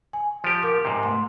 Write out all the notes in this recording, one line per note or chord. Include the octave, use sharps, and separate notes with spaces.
G#5
F3 G4
A#4 D6
G#2 C3
A3 C6